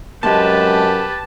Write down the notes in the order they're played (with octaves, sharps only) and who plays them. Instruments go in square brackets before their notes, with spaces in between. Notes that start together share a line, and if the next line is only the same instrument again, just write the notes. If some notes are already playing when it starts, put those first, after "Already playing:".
[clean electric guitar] C2 G#3 D#5 [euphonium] F#2 [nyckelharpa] G4 B4 [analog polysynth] A5